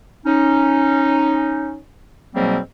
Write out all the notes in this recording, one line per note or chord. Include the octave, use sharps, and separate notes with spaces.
C#4 D#4
G#2 B2 F#3 G3 A#3 C4